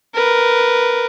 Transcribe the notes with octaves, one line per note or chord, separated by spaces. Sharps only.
A#4 B4